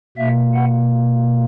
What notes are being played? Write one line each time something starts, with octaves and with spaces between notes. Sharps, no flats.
B2 A#3 E5
F#5